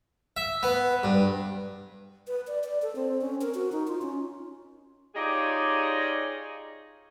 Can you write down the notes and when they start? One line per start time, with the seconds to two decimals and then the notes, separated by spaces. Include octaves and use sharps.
0.37 E5
0.63 B3
1.03 G2
2.27 B4
2.47 D5
2.64 D5
2.82 A4
2.96 C4
3.21 C#4
3.41 A#4
3.55 F#4
3.72 D#4
3.87 F4
4.02 C#4
5.15 D#4 F4 G4 G#4 C#5 D5